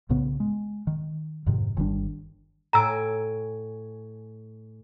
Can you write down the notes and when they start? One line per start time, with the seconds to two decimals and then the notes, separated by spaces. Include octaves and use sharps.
0.09 B1 A2 C#3 B3
0.40 G#3
0.87 D#3
1.46 F2 G#2 C3 D#3
1.77 G1 D#3 G3 D4
2.73 A2 G#5 A#5 E6 D7